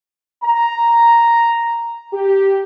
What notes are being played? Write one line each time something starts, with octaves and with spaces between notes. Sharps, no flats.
A#5
G4